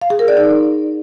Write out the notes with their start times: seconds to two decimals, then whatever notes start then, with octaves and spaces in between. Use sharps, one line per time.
0.01 F5
0.10 G#4
0.19 A#4
0.28 D5
0.37 D#4